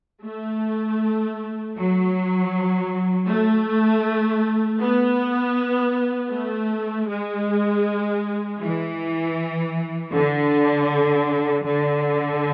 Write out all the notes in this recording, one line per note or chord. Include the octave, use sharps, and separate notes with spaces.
A3
F#3
A3
B3
A3
G#3
E3
D3
D3